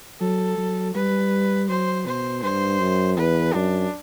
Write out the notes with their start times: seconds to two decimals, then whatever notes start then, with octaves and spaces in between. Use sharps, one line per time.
0.20 F#3 A4
0.58 F#3
0.94 G3 B4
1.69 F#3 C5
2.06 B2 C5
2.43 G2 C5
2.80 F#2
3.17 E2 B4
3.54 F#2 D4